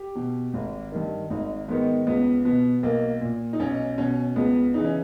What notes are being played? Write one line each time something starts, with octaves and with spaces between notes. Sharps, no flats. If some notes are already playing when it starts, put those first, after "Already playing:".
Already playing: G4
B2
G#1
G2 D#3
G#1 D#4
G#2 D#3 B3
C#2 B3
B2 B3
B1 A#3
A#2
D#4
B1 C#4
B2 C#4
C#2 B3
C#3 E3 D#4
C#4